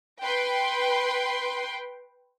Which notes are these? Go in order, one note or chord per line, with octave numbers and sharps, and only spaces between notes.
B4 G5 C6